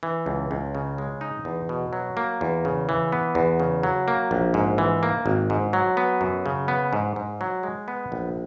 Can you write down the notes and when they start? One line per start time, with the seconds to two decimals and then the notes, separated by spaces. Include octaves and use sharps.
0.03 E3
0.26 C#2
0.51 C#2
0.75 C#3
0.98 G#3
1.21 D#4
1.45 E2
1.69 B2
1.93 F#3
2.17 A#3
2.41 E2
2.65 C#3
2.89 E3
3.12 B3
3.35 E2
3.60 C#3
3.83 F#3
4.08 A#3
4.31 A#1
4.54 G#2
4.78 E3
5.03 A#3
5.26 G#1
5.50 G#2
5.73 F#3
5.97 B3
6.21 F#2
6.46 C#3
6.68 B3
6.93 G#2
7.16 G#2
7.41 F#3
7.63 G#3
7.88 B3
8.12 A#1